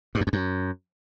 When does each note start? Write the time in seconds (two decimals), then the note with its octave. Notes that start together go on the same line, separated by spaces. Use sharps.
0.15 G2
0.21 F#2
0.27 F2
0.33 F#2